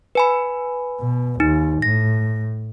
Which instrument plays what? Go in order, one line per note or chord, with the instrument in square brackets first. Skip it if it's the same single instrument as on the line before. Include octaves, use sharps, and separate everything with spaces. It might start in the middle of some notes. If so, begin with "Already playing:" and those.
[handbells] B4 G#5 B5
[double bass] B2
[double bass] D#2 [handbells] D#4
[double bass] A2 [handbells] A#6